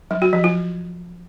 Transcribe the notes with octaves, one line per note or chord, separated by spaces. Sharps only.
F#3
F#4
F3
F4